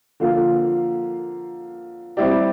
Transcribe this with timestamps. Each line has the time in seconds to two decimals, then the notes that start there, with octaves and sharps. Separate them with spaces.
0.20 D3 F3 A#3 F4 A#4
2.17 G3 C4 E4 G4 D5